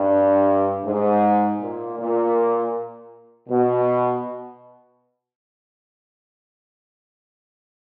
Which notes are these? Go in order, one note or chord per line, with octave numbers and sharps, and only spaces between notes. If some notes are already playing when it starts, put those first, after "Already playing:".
Already playing: G2
G#2
A#2
A#2
B2